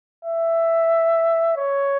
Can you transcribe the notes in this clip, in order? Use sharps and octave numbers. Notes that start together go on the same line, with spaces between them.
E5
C#5